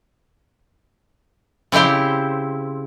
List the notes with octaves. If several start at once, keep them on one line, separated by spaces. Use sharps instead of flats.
C#3 C4 E4 G4 C5